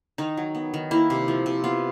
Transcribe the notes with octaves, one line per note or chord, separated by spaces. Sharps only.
D#3 D#4
F#3
B3
D#3
A#3 E4
C3
F3
C3
B3 F4